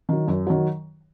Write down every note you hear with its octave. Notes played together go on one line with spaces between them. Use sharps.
D#3 F#3
F#2
D#3 F#3